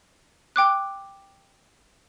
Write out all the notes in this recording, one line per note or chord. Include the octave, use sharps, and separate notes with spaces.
G5 D6 F#6